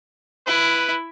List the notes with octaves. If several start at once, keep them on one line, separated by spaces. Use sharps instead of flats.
E4 B4